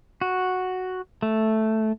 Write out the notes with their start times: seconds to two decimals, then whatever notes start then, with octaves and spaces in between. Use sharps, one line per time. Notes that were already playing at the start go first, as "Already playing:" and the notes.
0.21 F#4
1.22 A3